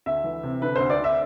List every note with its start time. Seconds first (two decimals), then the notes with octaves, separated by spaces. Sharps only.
0.06 D2 E5
0.24 E3
0.43 C3
0.62 D3 B4
0.76 D2 C5
0.90 D5
0.99 D3 E5